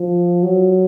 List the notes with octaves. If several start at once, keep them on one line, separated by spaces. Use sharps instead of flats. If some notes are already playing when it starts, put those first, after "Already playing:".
Already playing: F3
F#3